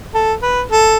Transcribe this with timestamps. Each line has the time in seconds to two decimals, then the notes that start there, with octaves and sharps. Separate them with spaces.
0.14 A4
0.42 B4
0.71 A4